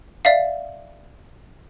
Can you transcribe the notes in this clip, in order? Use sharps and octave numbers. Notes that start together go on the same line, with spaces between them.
D5 E5 F5